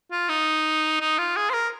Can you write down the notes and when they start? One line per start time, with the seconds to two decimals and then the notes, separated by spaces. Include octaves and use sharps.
0.12 F4
0.29 D#4
1.00 D#4
1.18 F4
1.36 G#4
1.50 C5
1.54 A#4